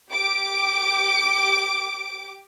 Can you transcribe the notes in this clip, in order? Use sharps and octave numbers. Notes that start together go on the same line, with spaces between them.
G4 D6 D7